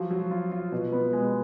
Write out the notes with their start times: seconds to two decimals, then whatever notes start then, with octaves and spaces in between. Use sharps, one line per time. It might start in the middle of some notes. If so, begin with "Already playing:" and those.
Already playing: F3 F#3
0.11 F#3
0.31 F4
0.52 F4
0.72 B2
0.92 B3
1.13 G#3